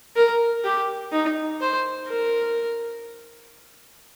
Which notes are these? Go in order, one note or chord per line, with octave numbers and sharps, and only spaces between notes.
A#4
G4
D#4
C5
A#4